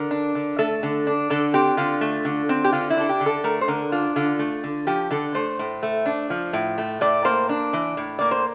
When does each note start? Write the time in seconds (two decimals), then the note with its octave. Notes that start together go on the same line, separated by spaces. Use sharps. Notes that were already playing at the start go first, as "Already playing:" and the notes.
Already playing: D3 A#4
0.11 D4
0.35 D3
0.59 A3 A4
0.83 D3
1.07 D4
1.30 D3 A4
1.54 C4 G4
1.77 D3 F4
2.01 A3
2.25 D3
2.49 C4
2.64 G4
2.73 D3 F4
2.90 E4
2.97 D4 A4
3.09 G4
3.20 D3
3.26 A4
3.44 A3 A#4
3.61 C5
3.68 D3 A#4
3.92 D4 F4
4.16 D3 F4
4.39 A3
4.64 D3
4.87 F3 G4
5.11 D3 A4
5.35 A3 C5
5.59 A2
5.83 A3
6.06 D4
6.30 F3
6.53 A2
6.78 A3
7.01 A2 D5
7.25 A#3 C5
7.49 D4
7.73 E3
7.97 A2
8.19 A#3 D5
8.31 C5